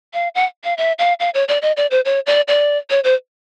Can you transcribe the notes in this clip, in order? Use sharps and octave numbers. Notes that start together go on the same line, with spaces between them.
F5
F#5
F5
E5
F5
F5
C#5
D5
D#5
D5
C5
C#5
D5
D5
C#5
C5